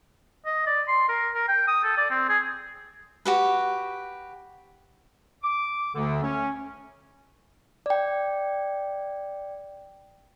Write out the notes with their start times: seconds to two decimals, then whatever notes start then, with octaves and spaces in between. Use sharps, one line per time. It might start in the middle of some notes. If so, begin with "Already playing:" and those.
0.46 D#5
0.67 D5
0.88 C6
1.09 A#4
1.34 A#4
1.48 G5
1.68 D#6
1.84 A4
1.98 D5
2.10 C4
2.29 G#4
3.25 F#4 G4 B4
5.43 D6
5.93 D2 D3
6.22 C#4
7.86 D5 G5